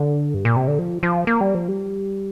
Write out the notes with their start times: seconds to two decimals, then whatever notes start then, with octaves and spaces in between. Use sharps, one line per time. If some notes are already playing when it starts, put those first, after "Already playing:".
Already playing: D3
0.34 G2
0.45 A#2
0.56 C3
0.68 D3
0.79 F3
1.03 F3
1.27 A#3
1.41 G3
1.55 F3
1.68 G3